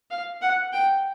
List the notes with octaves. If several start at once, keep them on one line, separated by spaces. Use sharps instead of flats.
F5
F#5
G5